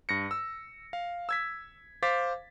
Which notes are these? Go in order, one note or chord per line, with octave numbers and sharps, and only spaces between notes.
G2 A#6 C#7
E6
F5
E6 G#6 B6
C5 F5 D6 A6 B6